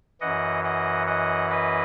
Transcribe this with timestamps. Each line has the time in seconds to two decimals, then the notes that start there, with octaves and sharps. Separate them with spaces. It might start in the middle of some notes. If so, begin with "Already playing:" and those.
0.21 F#2 E3 D#5 F#5
0.64 D#5 F#5
1.07 D#5 F#5
1.50 B4 D#5